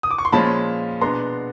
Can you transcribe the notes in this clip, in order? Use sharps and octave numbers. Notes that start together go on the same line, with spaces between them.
D#6
D6
C#6
C6
A#2 F3 G#3 C#4 A5 B5
B2 G#3 B3 D4 A#5 C6